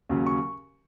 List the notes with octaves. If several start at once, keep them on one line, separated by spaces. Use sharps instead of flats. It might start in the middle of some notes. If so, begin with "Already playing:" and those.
D#2 C#3 F#3 C#4
C#6